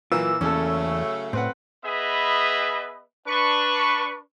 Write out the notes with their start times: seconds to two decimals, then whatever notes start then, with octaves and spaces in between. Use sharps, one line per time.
0.12 A#2 E3 F#3 A#3 F4 E6
0.41 E2 C#3 E3 F#3 A3 A#3 C#4 A4
1.33 A2 C4 B4 F#5
1.83 B3 G#4 B4 D#5 E5 B5
3.27 D4 B4 C#6